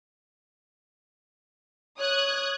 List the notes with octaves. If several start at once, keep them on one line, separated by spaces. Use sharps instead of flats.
C#5 D#6 F#6 G#6